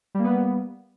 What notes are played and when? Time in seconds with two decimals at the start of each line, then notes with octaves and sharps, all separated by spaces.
0.15 G3
0.19 A#3
0.24 B3